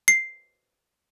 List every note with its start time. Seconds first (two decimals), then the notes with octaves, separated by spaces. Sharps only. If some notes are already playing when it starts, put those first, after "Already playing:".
0.08 C7